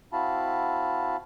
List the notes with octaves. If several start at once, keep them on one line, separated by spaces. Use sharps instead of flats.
C4 E4 F#4 F5 A5 B5